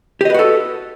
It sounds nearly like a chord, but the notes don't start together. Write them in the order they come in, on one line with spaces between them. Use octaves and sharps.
G4 D#5 B4 F#4 A4